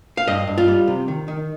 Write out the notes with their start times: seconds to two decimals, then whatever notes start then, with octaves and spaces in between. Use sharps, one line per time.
0.17 F5
0.27 G2 D#5
0.47 G2
0.58 F4
0.68 G3
0.88 C3
1.08 D#3
1.28 D#3